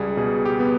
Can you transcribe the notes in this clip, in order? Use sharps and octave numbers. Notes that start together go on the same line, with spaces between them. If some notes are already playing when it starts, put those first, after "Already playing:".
Already playing: C#2 G3 G#4 D5
B2 G#4
G4
B3